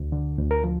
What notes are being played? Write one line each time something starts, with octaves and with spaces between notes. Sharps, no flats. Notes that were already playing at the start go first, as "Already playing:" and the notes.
Already playing: D2
D3
D2
A#4
F3